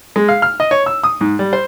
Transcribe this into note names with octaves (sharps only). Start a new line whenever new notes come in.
G#3
F5
F6
D#5
C#5
E6
D#6
G#2
G3
C5